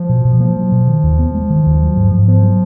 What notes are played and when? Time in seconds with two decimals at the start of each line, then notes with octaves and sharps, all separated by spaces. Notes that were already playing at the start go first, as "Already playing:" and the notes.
Already playing: F3
0.09 B2
0.25 B2
0.40 F3 A#3
0.56 F#3
0.72 B2
0.87 D#3
1.03 D#2
1.19 B3
1.34 G#3
1.50 D#3
1.66 D#2
1.81 F#3
1.97 G#2
2.12 G#2
2.28 F3 B3
2.43 F#3